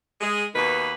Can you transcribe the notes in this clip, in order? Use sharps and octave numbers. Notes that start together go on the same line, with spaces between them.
G#3 G#4
D#2 B2 D#3 A#3 B4